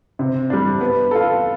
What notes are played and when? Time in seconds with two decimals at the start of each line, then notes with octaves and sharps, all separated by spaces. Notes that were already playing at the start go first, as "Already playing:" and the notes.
0.19 C3
0.50 G3 D4
0.81 B3
1.11 F4 A4